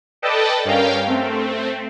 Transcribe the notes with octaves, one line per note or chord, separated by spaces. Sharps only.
A4 B4 D5 D#5 G5 A5
G2 C#4 A#4 F5 G5
A3 C4